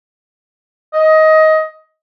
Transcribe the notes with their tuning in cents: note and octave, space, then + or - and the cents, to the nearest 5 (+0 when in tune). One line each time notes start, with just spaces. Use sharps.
D#5 +15